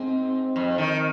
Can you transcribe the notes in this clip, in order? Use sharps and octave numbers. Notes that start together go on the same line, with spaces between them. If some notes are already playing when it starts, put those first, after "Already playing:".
Already playing: G#2 C4
F2
D#3